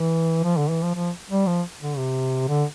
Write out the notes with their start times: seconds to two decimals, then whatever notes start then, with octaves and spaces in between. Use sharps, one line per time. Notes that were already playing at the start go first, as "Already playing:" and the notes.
Already playing: E3
0.44 F3
0.57 D3
0.70 E3
0.82 F3
0.95 F3
1.30 G3
1.47 F3
1.81 D3
1.98 C3
2.49 D3